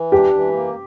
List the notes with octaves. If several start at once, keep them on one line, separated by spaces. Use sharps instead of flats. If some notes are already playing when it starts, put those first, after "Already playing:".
Already playing: E3
D4 G4
E3
A#3